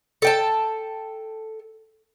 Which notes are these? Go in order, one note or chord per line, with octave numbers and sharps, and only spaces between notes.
A4 G5 A5